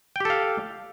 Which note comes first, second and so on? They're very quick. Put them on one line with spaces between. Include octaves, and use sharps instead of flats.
G5 G4 A4 F5